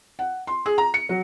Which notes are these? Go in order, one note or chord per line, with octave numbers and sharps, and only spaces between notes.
F#5
C6
G#4
A#5
C#7
F#3